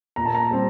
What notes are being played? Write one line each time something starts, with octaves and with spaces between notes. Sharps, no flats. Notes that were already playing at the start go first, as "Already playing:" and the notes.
A#2 A#5
A5
A#5
G3 C4